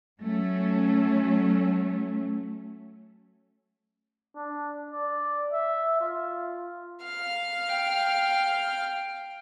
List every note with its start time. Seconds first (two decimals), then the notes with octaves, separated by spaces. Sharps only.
0.19 F#3 A3 C#4
4.35 D4
4.92 D5
5.53 E5
6.01 F4
7.03 F5 F6
7.67 G5